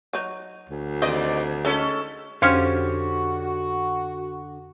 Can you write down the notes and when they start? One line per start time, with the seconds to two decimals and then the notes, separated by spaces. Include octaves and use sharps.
0.13 F#3 D#4
0.69 D2
1.02 D#2 C4 C5 D5 D#5
1.65 G#3 C#4 D#4 A4
2.42 F2 D3 C#4 F#4 G4 C5 C#5 F6